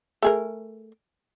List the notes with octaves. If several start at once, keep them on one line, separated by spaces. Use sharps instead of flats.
A3 G#4 A#4